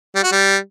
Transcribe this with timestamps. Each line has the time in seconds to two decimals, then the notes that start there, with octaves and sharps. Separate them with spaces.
0.15 G3
0.23 F#4
0.32 G3